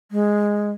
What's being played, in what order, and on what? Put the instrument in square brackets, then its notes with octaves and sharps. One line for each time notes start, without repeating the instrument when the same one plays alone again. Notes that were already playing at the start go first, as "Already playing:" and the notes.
[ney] G#3